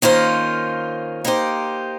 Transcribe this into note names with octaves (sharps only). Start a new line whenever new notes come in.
D#3 A#3 C#4 F4 C5
A#3 D#4 G4 C5